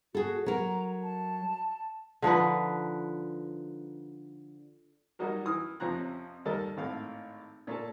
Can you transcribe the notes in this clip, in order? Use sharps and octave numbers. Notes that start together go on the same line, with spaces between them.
F#4 G#4 A4
F#3 A#4 A#5
A5
D3 F3 D#4 B4
F#3 G3 D#4 F#4 A#4
E3 D#6 F6
F2 C3 F3 C#4 A#5 F#6
D#2 G3 A4 A#4 D#5
G#1 A2 F5
A#2 C#4 A4